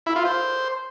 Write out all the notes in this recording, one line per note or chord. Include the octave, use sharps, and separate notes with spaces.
E4
F4
C5